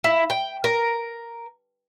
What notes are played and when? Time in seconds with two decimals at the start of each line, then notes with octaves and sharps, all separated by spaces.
0.04 E4
0.30 G5
0.64 A#4